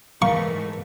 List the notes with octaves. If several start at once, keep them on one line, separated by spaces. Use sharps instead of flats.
G#2 E3 A3 A#4 F5 A#5 C#6